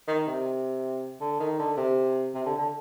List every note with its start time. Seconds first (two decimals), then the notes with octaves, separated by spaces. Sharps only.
0.08 D#3
0.27 C3
1.21 D3
1.40 D#3
1.59 D3
1.77 C3
2.34 C3
2.46 D3
2.58 D3